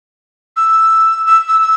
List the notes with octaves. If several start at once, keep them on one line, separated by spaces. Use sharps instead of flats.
E6
E6
E6
E6